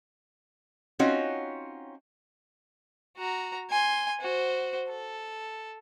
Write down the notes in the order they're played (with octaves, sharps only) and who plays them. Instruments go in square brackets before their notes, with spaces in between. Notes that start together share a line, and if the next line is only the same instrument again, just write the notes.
[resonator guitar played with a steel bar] C4 C#4 D#4 F4 F#4 C#5
[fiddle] F#4 A#5
G#5 C6
F#4 C5
A4